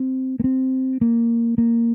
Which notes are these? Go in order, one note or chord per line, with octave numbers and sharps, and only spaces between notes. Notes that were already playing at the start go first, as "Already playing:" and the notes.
Already playing: C4
A#3
C4
A#3
A#3